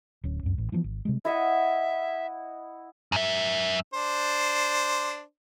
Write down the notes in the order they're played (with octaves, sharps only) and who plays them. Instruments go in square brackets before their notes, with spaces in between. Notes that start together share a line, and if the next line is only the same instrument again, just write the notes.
[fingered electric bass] D1 C#4
C#2 F#2
A1
E3 F3 A#3 B3
G#1
C3 G3 G#3
[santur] E4 D#5 F#5 [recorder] E5
[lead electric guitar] F#2 E5
[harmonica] D4 C5